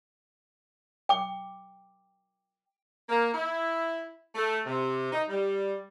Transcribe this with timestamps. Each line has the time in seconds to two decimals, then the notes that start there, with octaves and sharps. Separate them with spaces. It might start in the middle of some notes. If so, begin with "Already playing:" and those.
1.09 G5 D6
3.09 A#3
3.34 E4
4.35 A3
4.66 C3
5.13 D#4
5.29 G3